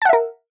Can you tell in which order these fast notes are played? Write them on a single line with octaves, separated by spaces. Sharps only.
A5 F#5 E5 A#4